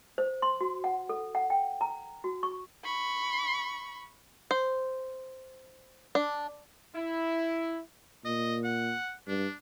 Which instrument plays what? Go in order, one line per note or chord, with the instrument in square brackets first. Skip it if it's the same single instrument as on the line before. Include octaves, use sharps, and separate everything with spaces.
[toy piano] C5
C6
F#4
F#5
A4
F#5
G5
A#5
F#4
C#6
[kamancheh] B5 C#6
[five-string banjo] C5
D4
[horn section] E4
[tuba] A#2 [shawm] D#5
[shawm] F#5
[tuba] G2 [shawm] D4